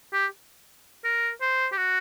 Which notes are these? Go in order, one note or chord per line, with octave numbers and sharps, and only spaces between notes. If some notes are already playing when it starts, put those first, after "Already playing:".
G4
A#4
C5
G4
F#4